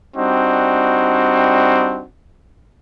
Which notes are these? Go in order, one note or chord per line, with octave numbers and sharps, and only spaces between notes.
G3 C4 D4 D#4 F#4